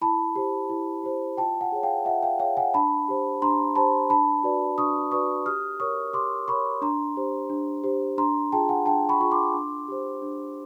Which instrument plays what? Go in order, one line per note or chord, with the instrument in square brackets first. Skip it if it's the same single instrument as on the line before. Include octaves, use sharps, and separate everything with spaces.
[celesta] E4 A5 B5
G4 C5
E4
G4 C5
F4 G5 A5
F#5 G#5
G#4 C#5
F5 G5
F4 E5 F#5
F5 G5
G#4 C#5 F5 G5
F#5 G#5
D4 A5 B5
G4 C5
D4 A#5 C6
G4 C5 A5 B5
D4 A5 B5
F#4 B4 D5
D4 C#6 D#6
F#4 B4 D5 C#6 D#6
G4 D#6 F6
A#4 C#5 C#6 D#6
G4 C6 D6
A#4 C#5 B5 C#6
D4 A#5 C6
G4 C5
D4
G4 C5
D4 A#5 C6
F4 G#4 G5 A5
F#5 G#5
D4 G5 A5
B5 C#6
F4 G#4 C#6
C6 D6
D4
G4 C5
D4